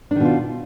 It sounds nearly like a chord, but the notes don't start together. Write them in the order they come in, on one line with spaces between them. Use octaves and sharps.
D4 D#3 B2 F4